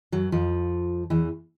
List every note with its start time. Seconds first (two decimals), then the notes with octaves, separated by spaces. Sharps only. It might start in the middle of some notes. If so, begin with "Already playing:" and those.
0.12 F#2 F#3
0.32 F2 F3
1.10 E2 E3